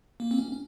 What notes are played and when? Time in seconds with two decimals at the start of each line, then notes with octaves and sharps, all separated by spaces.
0.20 A#3
0.31 C4
0.38 C#4
0.52 C#4